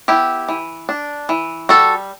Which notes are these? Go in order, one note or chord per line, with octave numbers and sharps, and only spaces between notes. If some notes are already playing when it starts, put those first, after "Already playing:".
B3 E4 G4
E3
D4
E3
G3 F#4 A4